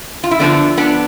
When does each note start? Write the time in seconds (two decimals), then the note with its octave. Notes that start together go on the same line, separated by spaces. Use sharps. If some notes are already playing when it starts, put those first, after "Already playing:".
0.24 F4
0.31 E4
0.40 D3 F3 A3 B3 D4
0.77 B3 D4